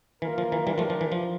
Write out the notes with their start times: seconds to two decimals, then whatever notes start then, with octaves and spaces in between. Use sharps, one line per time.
0.22 E3 A#3 F4 A#4
0.38 F3
0.52 E3
0.67 E3 G3 D4 G4 A#4
0.78 F3 A3
0.90 F3
1.01 E3
1.12 F3